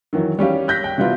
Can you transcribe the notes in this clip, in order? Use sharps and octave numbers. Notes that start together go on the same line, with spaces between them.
D#3 E3 F#3
G3 C#4 G4 F5
F#6 G6 A#6 B6
G5
C3 E3 G3 B3 F4 F#4